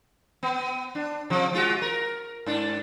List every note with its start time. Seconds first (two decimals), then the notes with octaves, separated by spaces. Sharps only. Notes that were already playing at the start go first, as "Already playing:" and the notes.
0.43 B3
0.95 D4
1.30 C3 F3
1.52 G#3 F4 F#4
1.82 A#4
2.46 G#2 D4